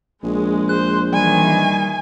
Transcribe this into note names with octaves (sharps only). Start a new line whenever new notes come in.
A#1 G#3
C5 F#6
D#3 E3 G3 G#5